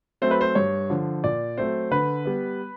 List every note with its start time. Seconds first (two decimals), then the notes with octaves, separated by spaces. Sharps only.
0.22 F#3 A3 C4 C5
0.31 B4
0.41 C5
0.55 G2 C#5
0.90 D3 F3
1.24 A#2 D5
1.57 F#3 A3 C4 C5
1.91 D3 B4
2.25 G3 B3